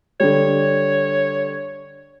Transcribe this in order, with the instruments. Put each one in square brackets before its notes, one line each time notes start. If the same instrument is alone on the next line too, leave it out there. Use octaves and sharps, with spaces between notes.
[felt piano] D3 G3 [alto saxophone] C#5